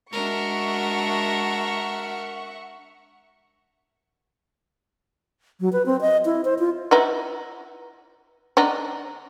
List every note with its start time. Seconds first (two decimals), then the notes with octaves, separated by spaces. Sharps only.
0.12 G#3 D4 F#4 A#4 E5 F#5 C#6
5.61 F#3
5.73 B4
5.86 C4
6.01 D#5
6.25 E4
6.45 C5
6.59 F4
6.91 B3 D#4 E4
8.57 D3 D4 D#4